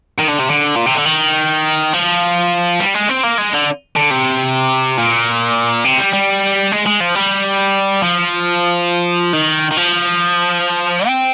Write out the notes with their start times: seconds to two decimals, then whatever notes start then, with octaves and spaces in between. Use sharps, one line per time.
0.19 D#3
0.29 D3
0.40 C3
0.50 D3
0.76 A#2
0.86 C3
0.96 D3
1.05 D#3
1.93 F3
2.80 G3
2.94 G#3
3.09 C4
3.23 A#3
3.38 G#3
3.53 D3
3.96 D3
4.10 C3
4.97 A#2
5.85 C3
5.99 G3
6.13 G3
6.71 G#3
6.86 G#3
7.00 F3
7.15 G3
8.02 F3
9.33 D#3
9.71 D#3
9.77 F3
11.07 C4